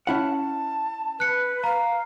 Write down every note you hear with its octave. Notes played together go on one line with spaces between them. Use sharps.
C#4 E4 F#5 A5
B4 F#6 C#7
F5 A#5